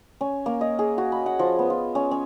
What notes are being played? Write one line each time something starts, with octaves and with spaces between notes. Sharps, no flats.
C#4
A#3
D#5
G#4
F#4
B5
F#5
F3
B3
F4
C#4
C#4